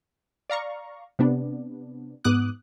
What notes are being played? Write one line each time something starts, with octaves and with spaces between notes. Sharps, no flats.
D5 F5 A#5 C#6
C3 B3 D4
G#2 B3 D6 D#6 F#6